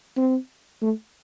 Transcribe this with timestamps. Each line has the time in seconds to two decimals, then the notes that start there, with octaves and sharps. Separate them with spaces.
0.17 C4
0.82 A3